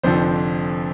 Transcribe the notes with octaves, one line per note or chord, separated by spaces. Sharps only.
F1 F2 D3 F3 C5